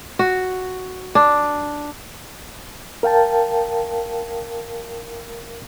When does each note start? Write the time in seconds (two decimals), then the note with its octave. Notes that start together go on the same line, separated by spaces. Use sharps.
0.19 F#4
1.15 D4
3.03 A#4 F5 G5 A5